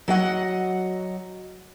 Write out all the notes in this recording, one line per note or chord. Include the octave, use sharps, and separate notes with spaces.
F#3 D#5 F#5